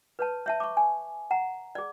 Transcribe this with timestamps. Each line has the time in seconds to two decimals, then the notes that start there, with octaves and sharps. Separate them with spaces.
0.19 B4 C#5 A5
0.46 C#5 E5 A5
0.60 C#6 D6
0.77 G#5
1.31 F#5 A#5
1.75 G#4 D5